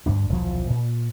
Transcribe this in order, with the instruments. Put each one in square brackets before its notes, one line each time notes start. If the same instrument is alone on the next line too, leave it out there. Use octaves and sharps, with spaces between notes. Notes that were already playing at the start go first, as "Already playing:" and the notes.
[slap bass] D2 G2 A#3 D4
D#1 B1 E3 F3
A#2